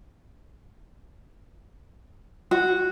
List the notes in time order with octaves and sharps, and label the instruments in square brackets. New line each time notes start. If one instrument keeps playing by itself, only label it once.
[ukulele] F#4